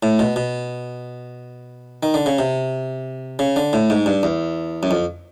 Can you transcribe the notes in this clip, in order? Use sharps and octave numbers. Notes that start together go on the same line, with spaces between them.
A2
B2
B2
D#3
D3
C#3
C3
C#3
D3
A2
G#2
G2
E2
F#2
F2